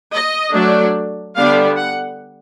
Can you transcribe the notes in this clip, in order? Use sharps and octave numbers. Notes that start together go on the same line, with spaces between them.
D#5
F#3 A3 D4
D3 G3 B3 D4 F5
F#5